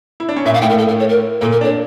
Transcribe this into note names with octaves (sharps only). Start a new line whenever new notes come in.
E4
D4
C#4
A#2 A#3 E5
F5
A2 A3 G5
A#4
A4
A#4
C#5
A#4
A#2 A#3 A4
A#4
D4 C#5